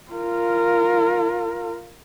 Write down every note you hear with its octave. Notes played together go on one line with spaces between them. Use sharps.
F4 A#4